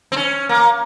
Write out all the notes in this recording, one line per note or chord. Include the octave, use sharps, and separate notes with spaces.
C4
C#4
A#3